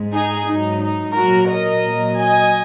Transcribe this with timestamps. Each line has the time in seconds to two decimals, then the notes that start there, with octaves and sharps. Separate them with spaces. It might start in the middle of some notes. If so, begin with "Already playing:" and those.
Already playing: G#2 G#3
0.13 D#4 G#4
0.47 G#2 F#3 D#4
0.82 D#4
1.16 A#2 F#3 F#4 A#4
1.50 A#4 D#5
1.85 A#2 F#3
2.19 D#5 G#5